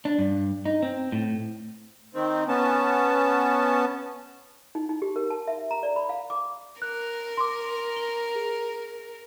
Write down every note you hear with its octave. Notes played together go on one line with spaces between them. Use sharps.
D4
G2
D#4
C4
A2
D#3 C4
B3 C#4 A5
D#4
D#4
G4
A#4
A5
E5
A#5
D5
B5
F5
D6
A#4 F#6
C6 D6
G7
G#4